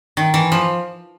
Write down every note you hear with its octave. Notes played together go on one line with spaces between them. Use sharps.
D#3
E3
F3